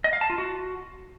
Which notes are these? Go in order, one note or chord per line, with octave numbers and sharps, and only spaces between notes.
D#5
F5
A5
F4
F#4